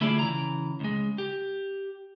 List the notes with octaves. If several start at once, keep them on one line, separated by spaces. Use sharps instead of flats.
D3 A3 E4 F4 G#4 D5
C#3 E3 A#5
C#2 G#3
G4